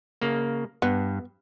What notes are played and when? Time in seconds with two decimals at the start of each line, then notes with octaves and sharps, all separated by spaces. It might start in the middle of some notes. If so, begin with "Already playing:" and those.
0.22 C#3 A#3
0.82 G2 B3